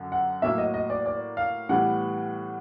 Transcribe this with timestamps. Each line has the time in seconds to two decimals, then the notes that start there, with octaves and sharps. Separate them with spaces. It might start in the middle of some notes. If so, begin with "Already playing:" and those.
Already playing: F#2 D3
0.12 F#5
0.42 A2 F#3 A#3 E5
0.58 D#5
0.74 D#5
0.90 D5
1.06 D5
1.37 F5
1.69 A2 E3 G3 B3 F#5